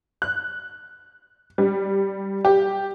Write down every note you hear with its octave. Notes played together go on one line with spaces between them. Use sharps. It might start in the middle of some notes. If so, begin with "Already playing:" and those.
F#6
G3
G4